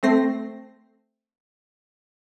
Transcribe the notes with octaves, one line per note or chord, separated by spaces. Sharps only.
A3 C4 A#6 C7